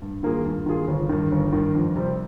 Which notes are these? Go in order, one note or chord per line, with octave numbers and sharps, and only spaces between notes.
G2
D#3 A#3 F4 G#4
G2
D#3 A#3 F4 G#4
G1
G2 D#3
G1
G2 D#3
F2
C3 G3 C4